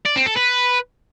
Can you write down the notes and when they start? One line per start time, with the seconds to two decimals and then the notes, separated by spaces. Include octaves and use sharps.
0.06 D5
0.16 C4
0.26 A4
0.36 B4